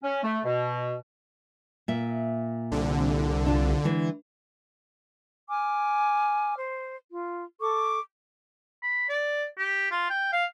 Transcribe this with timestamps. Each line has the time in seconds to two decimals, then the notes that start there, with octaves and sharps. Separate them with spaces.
0.03 C#4
0.23 A3
0.44 B2
1.88 A#2 E5
2.72 C2 D3
3.46 D4 F4
3.85 D3 E3 G#3
5.49 G#5 D6 F6
6.58 C5
7.11 F4
7.60 A4 C#6 D6
8.83 B5
9.09 D5
9.58 G4
9.91 F4
10.10 G5
10.33 F5